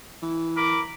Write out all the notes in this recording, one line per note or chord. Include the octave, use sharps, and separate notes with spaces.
E3
A#4 B5 D6